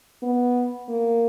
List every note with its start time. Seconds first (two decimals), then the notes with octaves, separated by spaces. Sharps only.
0.23 B3
0.89 A#3